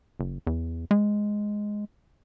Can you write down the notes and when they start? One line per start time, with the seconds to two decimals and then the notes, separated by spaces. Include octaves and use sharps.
0.20 F#1
0.47 E2
0.91 G#3